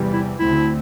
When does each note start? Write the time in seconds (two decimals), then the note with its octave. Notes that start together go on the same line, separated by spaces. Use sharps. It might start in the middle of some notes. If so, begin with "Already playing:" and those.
Already playing: E2 C3 E3 G3
0.13 E4
0.39 D2 D3 A3 C4 E4